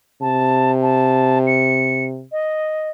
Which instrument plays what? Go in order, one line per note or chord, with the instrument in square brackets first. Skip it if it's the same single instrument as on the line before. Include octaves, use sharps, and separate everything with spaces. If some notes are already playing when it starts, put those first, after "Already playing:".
[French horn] C3 [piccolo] A5
[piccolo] A5
C#7
D#5